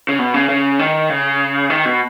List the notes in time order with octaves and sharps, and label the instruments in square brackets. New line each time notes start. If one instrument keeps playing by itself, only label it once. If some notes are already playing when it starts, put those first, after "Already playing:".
[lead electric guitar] C#3
B2
C#3
C#3
D#3
C#3
D#3
B2